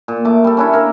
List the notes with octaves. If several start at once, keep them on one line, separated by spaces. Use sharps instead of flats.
A#2
A3 D6
G3 A4
C#4 D4 E4
A#3 A#4 A#5